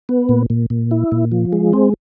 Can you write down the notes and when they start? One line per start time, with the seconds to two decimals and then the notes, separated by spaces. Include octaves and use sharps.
0.09 B3
0.29 A#2
0.50 A#2
0.70 A#2
0.91 E4
1.12 A#2
1.32 F3
1.53 G#3
1.73 C4